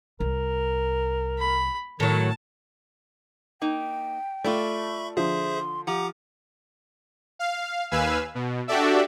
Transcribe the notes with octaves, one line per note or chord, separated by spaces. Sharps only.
C2 A#4
B5
A2 D#3 F#3 A5
A#3 D#4 G5
A3 F4 A4 D5 E5 B5 C#6
D3 F3 G#4 C5 E5 C6
F3 G4 F#5 A#5 D6
F5
D#2 B4 F5 G#5 E6
B2
D4 F#4 G4 A4 D5 E5